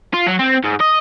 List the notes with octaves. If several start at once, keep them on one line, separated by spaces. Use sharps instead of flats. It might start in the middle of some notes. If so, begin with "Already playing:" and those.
F4
F#3
C4
G#2
D#5